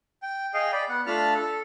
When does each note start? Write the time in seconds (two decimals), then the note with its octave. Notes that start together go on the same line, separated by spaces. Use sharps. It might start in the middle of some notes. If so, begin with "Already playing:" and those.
0.22 G5
0.54 G#4 D#5 F5 G5
0.73 D5 B5
0.89 B3 F#5
1.07 A3 D4 F4 A5 B5 F6
1.35 A4